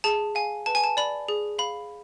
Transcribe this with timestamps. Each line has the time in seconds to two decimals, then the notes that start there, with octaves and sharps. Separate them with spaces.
0.04 G#4 A5
0.35 F5 G#5
0.66 B4 A5
0.75 G#5
0.84 A5
0.97 D5 B5
1.29 G#4
1.59 F5 B5